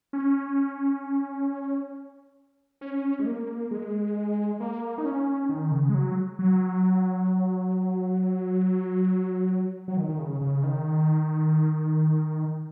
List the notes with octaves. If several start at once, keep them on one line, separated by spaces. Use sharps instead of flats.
C#4
C#4
G#3
A#3
G#3
A#3
D#4
C#4
D#3
C#3
G#3
F#3
F#3
F#3
D#3
D#3
C#3
C#3
D#3